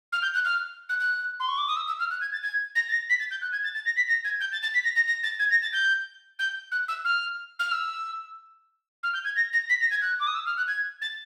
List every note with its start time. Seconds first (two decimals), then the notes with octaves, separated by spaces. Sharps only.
0.12 F6
0.22 G6
0.34 F#6
0.45 F6
0.89 F#6
1.00 F#6
1.39 C6
1.48 C#6
1.58 D6
1.67 D#6
1.76 E6
1.87 E6
1.99 F6
2.10 F#6
2.21 G#6
2.32 A6
2.43 G#6
2.75 A#6
2.88 A6
2.92 A#6
3.09 B6
3.19 A6
3.30 G6
3.41 F#6
3.52 G#6
3.64 A6
3.74 A6
3.85 A#6
3.96 B6
4.08 A#6
4.24 G#6
4.40 G6
4.52 A6
4.62 A6
4.74 B6
4.84 A#6
4.95 A#6
5.07 A#6
5.23 A6
5.39 G#6
5.50 A#6
5.62 A6
5.73 G6
6.39 G6
6.71 F#6
6.88 E6
7.04 F6
7.59 F6
7.71 E6
9.03 F6
9.13 G6
9.24 G#6
9.36 A#6
9.53 A#6
9.69 B6
9.80 A#6
9.91 G#6
10.02 F#6
10.19 D6
10.27 D#6
10.35 E6
10.46 F6
10.57 F#6
10.68 G#6
11.01 A6